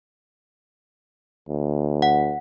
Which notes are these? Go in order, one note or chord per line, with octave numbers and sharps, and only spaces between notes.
D2
F#5